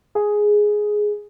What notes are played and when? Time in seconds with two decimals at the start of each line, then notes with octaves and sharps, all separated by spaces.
0.15 G#4